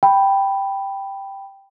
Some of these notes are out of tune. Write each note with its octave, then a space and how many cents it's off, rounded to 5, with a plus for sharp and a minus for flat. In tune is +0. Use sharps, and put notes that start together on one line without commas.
G5 +0 B5 +0